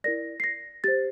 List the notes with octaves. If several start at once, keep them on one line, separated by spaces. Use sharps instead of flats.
E4 A#4 D5 A#6
C7
A#6
G4 C5 A6